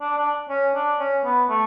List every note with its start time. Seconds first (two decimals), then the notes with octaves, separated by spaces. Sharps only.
0.01 D4
0.17 D4
0.50 C#4
0.75 D4
0.99 C#4
1.25 B3
1.49 A3